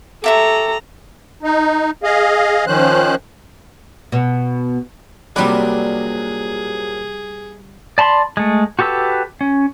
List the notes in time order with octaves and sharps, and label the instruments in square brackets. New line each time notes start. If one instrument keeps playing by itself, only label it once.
[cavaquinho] G4 E5 C#6 [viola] A4 A#5
[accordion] D#4
G#4 D#5 F5
D#3 F3 C#4 C5 F#6
[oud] B2
[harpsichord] A#1 F#3 F#4 [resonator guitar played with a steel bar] C3 D5 [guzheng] G3 B4 [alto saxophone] G#4
[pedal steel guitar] D5 A5 B5 C6
G#3 A3
F#4 G4 A4 B4 E6
C#4